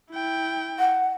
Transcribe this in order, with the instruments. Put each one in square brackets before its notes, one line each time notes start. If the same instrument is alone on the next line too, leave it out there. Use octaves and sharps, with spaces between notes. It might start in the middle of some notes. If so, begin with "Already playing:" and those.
[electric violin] E4 G5
[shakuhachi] F#5